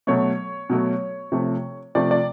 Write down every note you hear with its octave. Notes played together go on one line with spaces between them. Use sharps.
B2 F#3 A3 C#5
B2 F#3 A3
C3 F3 A3
C3 F3 A3 D5
D5